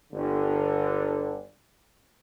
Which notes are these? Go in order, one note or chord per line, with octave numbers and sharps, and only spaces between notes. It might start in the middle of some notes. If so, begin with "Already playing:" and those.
G1 D3